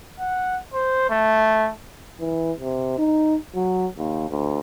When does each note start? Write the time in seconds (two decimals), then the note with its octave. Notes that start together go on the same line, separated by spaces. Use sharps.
0.20 F#5
0.73 C5
1.10 A3
2.20 E3
2.60 C3
2.98 D#4
3.55 F#3
3.98 D#2
4.30 D2